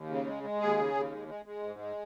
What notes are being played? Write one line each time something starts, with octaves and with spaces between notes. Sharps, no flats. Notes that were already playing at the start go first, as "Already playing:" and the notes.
Already playing: D#2
C#3
G#3
G#3
D#2 G#4
C#3
D#2
G#3
G#3
G#3
G#2
G#3